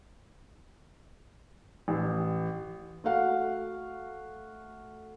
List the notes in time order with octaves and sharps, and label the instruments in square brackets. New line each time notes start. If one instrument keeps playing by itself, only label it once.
[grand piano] A1
[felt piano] A3 F#4 F5 F#5